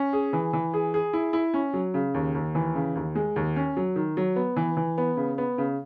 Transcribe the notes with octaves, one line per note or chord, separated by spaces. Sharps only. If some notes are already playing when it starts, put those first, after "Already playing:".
Already playing: C#4
G#4
E3
E3
G#4
G#4
E4
E4
C#4
F#3
C#3
D#2
D#2
E3
C#3
D#2
G#3
D#2
C#4
F#3
D#3
F#3
B3
E3
E3
B3
C#3
B3
C#3